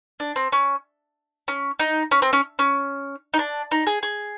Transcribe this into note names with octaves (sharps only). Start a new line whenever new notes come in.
D4
C4
C#4
C#4
D#4
C#4
C4
C#4
C#4
D#4
D4
D#4
G#4
G#4